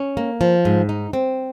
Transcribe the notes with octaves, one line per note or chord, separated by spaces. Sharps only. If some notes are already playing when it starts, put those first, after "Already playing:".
Already playing: C#4
A#3
F3
G#2
D#4
C4